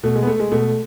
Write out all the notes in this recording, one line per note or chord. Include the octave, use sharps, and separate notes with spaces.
B2 A3
G#3
B3
A3
G#3
B2 A3